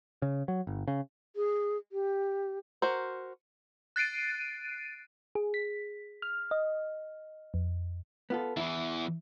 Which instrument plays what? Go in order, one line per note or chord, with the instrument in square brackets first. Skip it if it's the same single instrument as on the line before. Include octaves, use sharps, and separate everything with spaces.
[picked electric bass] C#3
F#3
G1
C#3
[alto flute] G#4
G4
[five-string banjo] F#4 A#4 C5
[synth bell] F#6 A6 C7 D7 D#7
[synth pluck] G#4
B6
F6
D#5
F2
[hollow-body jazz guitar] B3 F4 A4
[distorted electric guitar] E2 E3 [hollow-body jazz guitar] E4